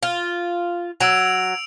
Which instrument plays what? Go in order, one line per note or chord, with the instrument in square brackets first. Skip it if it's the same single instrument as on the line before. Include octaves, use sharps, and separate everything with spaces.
[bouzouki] F4
[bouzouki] F#3 [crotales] E6 D7 F7